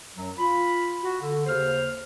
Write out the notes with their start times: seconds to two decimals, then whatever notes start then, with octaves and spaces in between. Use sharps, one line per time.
0.17 F#2 F#3
0.38 F4 B5
1.03 F#4
1.21 D3
1.46 D#2 C#3 C5 F6